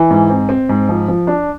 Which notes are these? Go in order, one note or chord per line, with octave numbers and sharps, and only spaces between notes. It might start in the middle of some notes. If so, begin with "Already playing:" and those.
Already playing: E3
G#2
C4
C4
G#2
F3
F3
D4